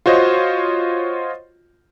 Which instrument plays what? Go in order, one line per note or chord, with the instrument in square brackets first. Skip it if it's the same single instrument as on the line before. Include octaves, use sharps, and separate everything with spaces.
[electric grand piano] F4 F#4 C5 C#5 D#5